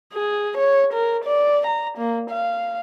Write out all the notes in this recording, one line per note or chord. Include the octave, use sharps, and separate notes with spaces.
G#4
C#5
A#4
D5
A#5
A#3
F5